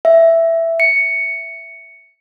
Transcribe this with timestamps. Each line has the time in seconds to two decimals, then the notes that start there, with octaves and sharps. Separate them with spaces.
0.05 E5
0.80 C#7